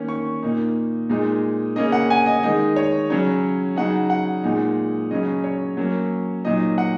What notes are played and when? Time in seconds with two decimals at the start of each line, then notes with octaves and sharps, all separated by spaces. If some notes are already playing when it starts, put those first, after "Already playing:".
Already playing: D#3 A#3 C#4
0.08 C#6
0.42 A#2 A#3 D#4
1.10 A#2 G#3 D#4
1.76 C#3 A#3 C#4 D#5
1.92 F#5
2.10 G#5
2.26 D#5
2.43 D#3 G#3 D#4 D#5
2.76 C#5
3.10 C#3 F#3 C#4 C#5
3.76 C#3 F#3 D#4 F#5
4.10 F#5
4.44 A#2 G#3 D#4
5.11 C#3 F#3 C#4 D#5
5.44 C#5
5.77 F#3 A#3 C#4
6.45 A#2 F#3 D#4 D#5
6.78 F#5